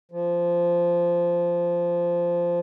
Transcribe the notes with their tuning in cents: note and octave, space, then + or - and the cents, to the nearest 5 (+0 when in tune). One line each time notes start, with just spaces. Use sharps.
F3 -10